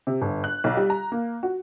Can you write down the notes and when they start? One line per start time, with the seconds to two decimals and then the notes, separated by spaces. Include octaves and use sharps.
0.07 C3
0.22 G1
0.44 F#6
0.64 B1
0.77 G3
0.90 A#5
1.12 A#3
1.43 F#4